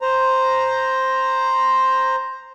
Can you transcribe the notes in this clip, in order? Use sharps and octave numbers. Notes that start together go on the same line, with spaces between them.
C5 A#5